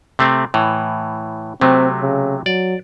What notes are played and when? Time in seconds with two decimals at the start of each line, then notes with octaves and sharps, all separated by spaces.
0.19 C3 A3 C4
0.54 A2 E3
1.61 C3 F#3 A3 C4
2.02 C#3
2.46 F#3 D5